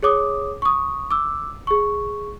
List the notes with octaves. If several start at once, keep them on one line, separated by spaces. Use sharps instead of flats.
G#4 C#5 D6 D#6
C#6 D#6
D6 E6
G#4 C#6